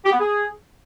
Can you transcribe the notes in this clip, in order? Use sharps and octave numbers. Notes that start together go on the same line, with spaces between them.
G4
B3
G#4